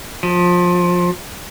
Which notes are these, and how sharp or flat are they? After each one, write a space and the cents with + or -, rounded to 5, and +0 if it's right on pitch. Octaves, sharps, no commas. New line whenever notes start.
F3 +20